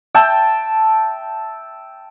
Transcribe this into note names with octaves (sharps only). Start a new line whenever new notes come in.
E5 G5 A5